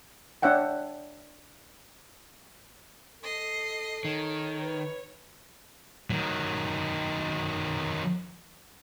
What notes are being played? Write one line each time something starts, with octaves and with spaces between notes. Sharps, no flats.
D4 C#5 E5 F#5 G5
A4 D#5 C7
D#3 C#5
B4
D#3 F#3